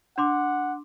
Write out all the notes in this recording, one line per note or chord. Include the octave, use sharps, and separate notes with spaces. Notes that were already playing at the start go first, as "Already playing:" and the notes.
D4 F#5 C6 D6